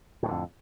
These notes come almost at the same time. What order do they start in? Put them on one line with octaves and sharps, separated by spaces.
A2 D#3 D3 F2